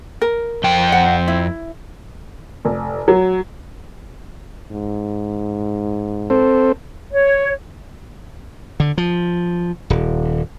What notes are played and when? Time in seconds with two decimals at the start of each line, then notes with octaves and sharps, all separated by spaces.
0.22 A#4
0.64 F2 G5
0.92 F#5
1.28 E4
2.65 F1
3.08 F#3
4.72 G#2
6.30 C4 A4 C5
7.12 C#5
8.80 D3
8.98 F3
9.90 D#1